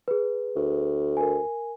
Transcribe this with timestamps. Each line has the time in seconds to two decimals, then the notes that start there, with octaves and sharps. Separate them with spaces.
0.08 G#4 B4
0.56 D2
1.17 A#4 G#5